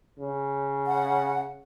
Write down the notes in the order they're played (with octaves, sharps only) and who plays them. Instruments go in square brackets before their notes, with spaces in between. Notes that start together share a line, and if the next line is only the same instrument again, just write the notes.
[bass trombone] C#3
[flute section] F#5